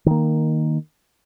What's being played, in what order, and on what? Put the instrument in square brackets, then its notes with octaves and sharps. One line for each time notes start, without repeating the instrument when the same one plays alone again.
[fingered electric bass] D#3 A#3